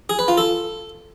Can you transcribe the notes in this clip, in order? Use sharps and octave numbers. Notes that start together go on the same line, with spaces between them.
G#4
B4
F4
A4